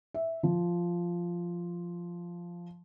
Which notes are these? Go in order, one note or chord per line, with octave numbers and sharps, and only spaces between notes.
E5
F3